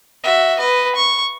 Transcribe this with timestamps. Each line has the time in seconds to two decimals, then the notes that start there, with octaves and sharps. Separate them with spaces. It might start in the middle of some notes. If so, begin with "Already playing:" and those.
0.23 F#4 E5
0.59 B4 D#5
0.95 C#6